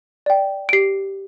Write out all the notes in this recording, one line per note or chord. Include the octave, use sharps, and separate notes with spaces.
D5 G5
D7
G4 C7